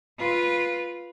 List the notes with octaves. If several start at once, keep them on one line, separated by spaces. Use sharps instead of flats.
F4 B4